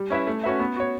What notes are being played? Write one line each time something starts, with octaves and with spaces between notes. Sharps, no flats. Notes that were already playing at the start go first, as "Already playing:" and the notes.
Already playing: G3
C#4 E4 B4 E5
A3
C#4 F#4 B4 E5
B3
F#4 C#5